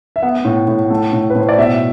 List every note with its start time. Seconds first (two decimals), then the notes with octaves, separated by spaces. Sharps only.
0.16 E5
0.22 B3 F#5
0.45 A2
0.68 A2
0.90 A3
1.13 A2
1.30 B4
1.35 A2 C5
1.49 D5
1.58 B2 E5